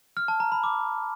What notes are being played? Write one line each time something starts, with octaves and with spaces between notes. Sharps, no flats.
F6
A5
A#5
B5
D6